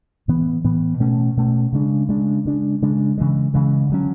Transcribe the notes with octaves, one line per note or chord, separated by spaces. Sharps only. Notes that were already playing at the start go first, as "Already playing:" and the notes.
A2 E3 B3
A2 E3 B3
B2 A3 C#4
B2 A3 C#4
C#3 G#3 D4
C#3 G#3 D4
C#3 G#3 D4
C#3 G#3 D4
C#3 E3 G#3
C#3 E3 G#3
D3 F#3 C#4